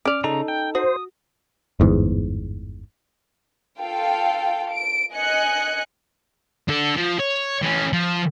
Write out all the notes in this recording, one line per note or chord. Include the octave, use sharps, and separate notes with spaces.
C#4 D5 D6 F6
C#3 D#4 A4 A#5
G5
F#4 C5 D#6
G1 E2 G#2
F4 A4 F5 G5
D7
D#5 G#5 F#6 C#7
D3 A4
F3
C#5
E3 C#4
F3